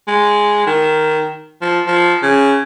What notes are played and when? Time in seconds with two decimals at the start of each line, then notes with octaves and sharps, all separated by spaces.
0.08 G#3
0.67 D#3
1.61 F3
1.87 F3
2.23 C#3